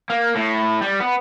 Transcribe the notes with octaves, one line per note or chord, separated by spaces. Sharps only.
A#3
A2
G3
B3